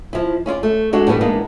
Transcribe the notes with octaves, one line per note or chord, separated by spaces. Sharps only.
F3 E4
C#4 E4 F4 D5
A3
G#3 D4 F#4 A4
A2 E3 G3 B3 D4
E3 G#3 A#3 B3 D4 D#4